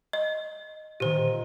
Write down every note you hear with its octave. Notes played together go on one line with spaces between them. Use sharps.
D#5
A#2 D#3 G4 C5